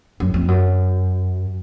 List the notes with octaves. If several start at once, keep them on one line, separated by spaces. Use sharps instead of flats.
F#2
F2
F#2